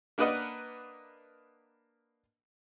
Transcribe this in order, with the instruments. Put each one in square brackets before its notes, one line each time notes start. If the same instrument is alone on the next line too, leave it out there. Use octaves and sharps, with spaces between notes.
[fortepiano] A#3 D4 A#4 B4 D#5 F#5